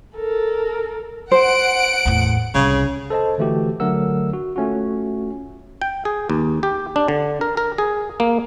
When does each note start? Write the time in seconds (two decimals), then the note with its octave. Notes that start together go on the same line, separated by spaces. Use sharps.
0.16 A4 A#4
1.31 C5 F#5 D7
2.05 E2 A2
2.55 C2 C#3
3.10 A4 C5 D#5 A5
3.38 D3 E3 A3 F#4 G4
3.80 D3 F#3 A3 A#4 F#5 E6
4.34 F#4
4.56 A3 C#4 F4 F#4
5.82 G5
6.05 G#4
6.30 D#2
6.63 G4
6.96 D4
7.08 D3
7.41 A#4
7.57 A#4
7.78 G#4
8.20 A#3